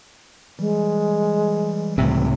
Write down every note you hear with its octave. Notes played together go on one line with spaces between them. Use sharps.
E3 G3 G#3
C#2 A2 C3